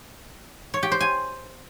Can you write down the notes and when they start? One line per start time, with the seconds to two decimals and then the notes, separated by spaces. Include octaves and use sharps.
0.74 C#5
0.83 G4
0.92 C5
1.01 G#5